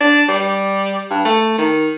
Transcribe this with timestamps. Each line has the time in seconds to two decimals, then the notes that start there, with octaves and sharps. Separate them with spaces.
0.01 D4
0.28 G3
1.11 G2
1.25 A3
1.58 D#3